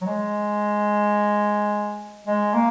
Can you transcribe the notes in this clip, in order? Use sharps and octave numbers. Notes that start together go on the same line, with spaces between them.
F#3
G#3
G#3
A#3